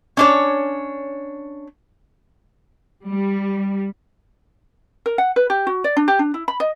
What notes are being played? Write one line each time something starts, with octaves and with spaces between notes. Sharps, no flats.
C#4 D4 C#5
G3
A#4
F#5
B4
G4
F#4
D5
D4
G4
D4
E4
B5
D#5